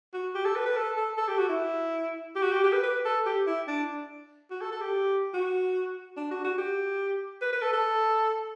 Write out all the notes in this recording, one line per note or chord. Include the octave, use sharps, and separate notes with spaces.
F#4
G4
A4
B4
B4
A4
A4
A4
G4
F#4
E4
G4
F#4
G4
G4
B4
B4
A4
G4
E4
D4
F#4
A4
A4
G4
F#4
D4
F#4
F#4
G4
B4
B4
A4
A4